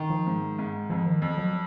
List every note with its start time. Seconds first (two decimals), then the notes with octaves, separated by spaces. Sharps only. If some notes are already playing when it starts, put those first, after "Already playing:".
Already playing: D#3
0.10 F3
0.27 G#2
0.59 G#2
0.90 F2 F3
1.06 D#3
1.22 F2
1.38 F#3